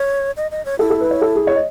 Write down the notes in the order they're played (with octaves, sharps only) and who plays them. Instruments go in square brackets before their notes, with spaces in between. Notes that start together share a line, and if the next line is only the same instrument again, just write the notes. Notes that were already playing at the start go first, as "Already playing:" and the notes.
Already playing: [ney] C#5
D#5
D#5
C#5
[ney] E4 [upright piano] A4
[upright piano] A4
B4
C#5
A4
G#4
C#5
D#5